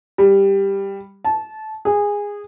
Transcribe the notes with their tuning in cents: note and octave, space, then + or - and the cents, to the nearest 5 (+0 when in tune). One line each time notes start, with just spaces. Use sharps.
G3 +5
A5 -20
G#4 -15